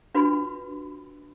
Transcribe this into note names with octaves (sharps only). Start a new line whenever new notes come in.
D4 F4 F#4 B4 B5 C6